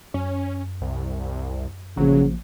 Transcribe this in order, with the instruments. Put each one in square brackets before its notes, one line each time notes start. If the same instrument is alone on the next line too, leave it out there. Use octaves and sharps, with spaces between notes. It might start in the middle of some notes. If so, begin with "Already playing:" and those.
[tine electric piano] F#2 [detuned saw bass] C#4
[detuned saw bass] C2
[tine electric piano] A1 F3 A#3 [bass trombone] C#3 [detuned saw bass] F#3